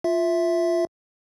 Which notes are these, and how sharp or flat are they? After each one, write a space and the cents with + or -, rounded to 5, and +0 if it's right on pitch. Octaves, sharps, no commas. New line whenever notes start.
F4 +0 E5 +0